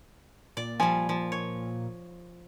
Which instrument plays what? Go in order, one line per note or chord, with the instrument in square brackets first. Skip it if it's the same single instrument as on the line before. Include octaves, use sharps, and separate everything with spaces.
[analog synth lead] A#2 [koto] D5
[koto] F3 G3 [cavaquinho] G#5
[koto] F3
C#5